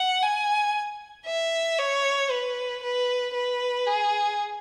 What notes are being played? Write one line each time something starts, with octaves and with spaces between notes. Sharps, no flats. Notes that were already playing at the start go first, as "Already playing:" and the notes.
Already playing: F#5
G#5
E5
C#5
B4
B4
B4
G#4